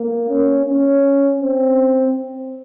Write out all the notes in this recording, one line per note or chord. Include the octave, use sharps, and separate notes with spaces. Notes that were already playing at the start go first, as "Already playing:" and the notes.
Already playing: A#3
C#4
C#4
C4